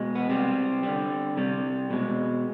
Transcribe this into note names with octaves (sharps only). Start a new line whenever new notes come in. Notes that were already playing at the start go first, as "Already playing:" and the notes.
Already playing: B2 G#3
B3
C3 G3 C4
D3 G3
C3 G3
B2 G#3